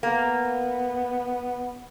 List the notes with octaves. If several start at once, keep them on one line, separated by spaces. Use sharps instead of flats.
A#3 B3